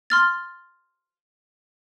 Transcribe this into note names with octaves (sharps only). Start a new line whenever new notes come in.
C6 F6 A6